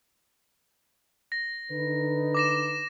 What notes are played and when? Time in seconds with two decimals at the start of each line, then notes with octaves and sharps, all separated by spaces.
1.32 A#6
1.71 D3 D#4 B4
2.35 D6 A#6 E7